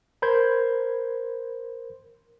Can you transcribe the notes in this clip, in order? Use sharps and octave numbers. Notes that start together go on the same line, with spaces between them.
A#4 C5 B5 C6 G6 G#6